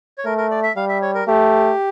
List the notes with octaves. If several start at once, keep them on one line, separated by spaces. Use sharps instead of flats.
C#5
A3 A#4
A#4
D5
E5
G3 F5
E5
C#5
A#4
A3 G4